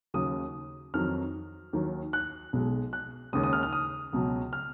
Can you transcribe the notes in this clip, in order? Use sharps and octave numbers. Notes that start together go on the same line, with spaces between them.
D#2 C#3 F#3 D#6
F2 D#3 F#3 F6
D#2 D#3 F#3
F#6
B1 B2 G#3
F#6
D#2 C#3 G#3 D#6
D#6
F6
F6
D#6
C#2 B2 F#3
F6